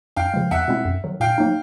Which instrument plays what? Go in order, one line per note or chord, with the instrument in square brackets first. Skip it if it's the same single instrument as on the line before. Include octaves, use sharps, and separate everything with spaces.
[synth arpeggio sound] F#2 [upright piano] F5 G5
[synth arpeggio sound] C#3 F3 G#3
[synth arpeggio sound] E2 [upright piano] E5 F#5
[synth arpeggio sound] B2 G#3 C4 E4
F#2
D#3 F#3
[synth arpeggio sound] A#2 [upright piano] F5 G5
[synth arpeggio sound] F#3 A#3 D#4